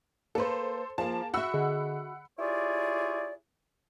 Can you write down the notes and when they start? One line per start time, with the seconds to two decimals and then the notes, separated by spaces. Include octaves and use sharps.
0.35 A#3 A4 B4 C5
0.98 F3 A#3 G#4 F5 G#5 A5
1.34 F#4 E5 F#5 B5 E6
1.54 D3 G#4 D#5
2.39 E4 F4 G4 G#4 C#5 D5